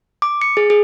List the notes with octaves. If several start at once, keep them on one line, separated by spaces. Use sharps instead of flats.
D6
C#7
G#4
G#4